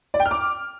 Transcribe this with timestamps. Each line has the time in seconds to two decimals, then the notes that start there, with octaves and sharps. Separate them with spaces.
0.14 D5
0.20 G5
0.25 F6
0.31 D6